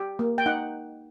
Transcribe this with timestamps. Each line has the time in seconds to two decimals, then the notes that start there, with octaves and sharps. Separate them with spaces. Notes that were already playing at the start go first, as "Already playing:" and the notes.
Already playing: G4
0.19 A#3
0.38 G5
0.46 D#4 F#5